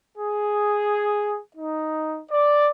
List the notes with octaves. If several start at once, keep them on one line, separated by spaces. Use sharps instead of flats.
G#4
D#4
D5